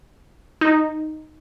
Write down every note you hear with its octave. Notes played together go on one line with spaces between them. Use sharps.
D#4